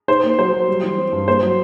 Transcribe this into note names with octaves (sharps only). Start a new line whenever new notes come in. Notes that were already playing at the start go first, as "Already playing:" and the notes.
D#4 C5
A#3
F#3 C5
F#3
G3
E3
C4
G2
A#3 C5
F#3